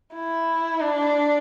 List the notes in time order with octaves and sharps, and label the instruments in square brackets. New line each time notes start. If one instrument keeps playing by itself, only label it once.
[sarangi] E4
D4